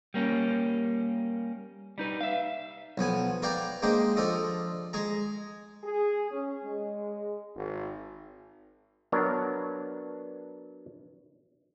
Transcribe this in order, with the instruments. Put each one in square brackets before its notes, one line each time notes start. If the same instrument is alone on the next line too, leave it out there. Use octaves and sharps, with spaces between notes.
[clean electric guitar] G3 A#3 C#4
G3 D#4 B4
E5 F5
[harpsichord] B1 F3 B3 G#5
A#4 B4 D5 F5 G5 A#5
G#3 A#3 D4 D#4 C5 G5
F3 D4 F4 A4 D#5
G#3 G#4 A#5
[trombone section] G#4
C#4
G#3
G#1
[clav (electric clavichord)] F#3 B3 D4 A#4 C#5